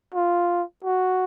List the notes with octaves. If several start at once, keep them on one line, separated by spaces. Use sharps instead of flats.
F4
F#4